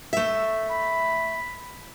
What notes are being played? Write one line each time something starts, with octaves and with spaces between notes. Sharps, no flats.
A3 E5
B5